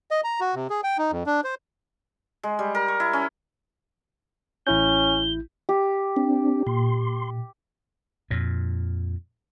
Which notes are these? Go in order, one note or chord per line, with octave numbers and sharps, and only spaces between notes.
D#5
A#5
F#4
C3
G#4
G5
D#4
F2
D4
C5
G#3
G3
A#4
C#6
E4
C#4
A1 C#4 E4 G6 G7
G4
C4 D4
A#2 C6
F2 A#2